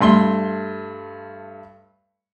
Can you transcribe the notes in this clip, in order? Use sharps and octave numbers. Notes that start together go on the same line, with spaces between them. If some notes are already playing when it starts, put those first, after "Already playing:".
G2 A3 C6 G7